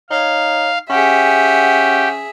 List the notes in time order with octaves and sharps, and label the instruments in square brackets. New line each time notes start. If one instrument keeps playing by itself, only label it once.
[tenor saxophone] D#4 [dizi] C#5 [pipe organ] F5
[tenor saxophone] C#4 [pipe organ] G4 [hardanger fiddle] G#4 E5 [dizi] F#5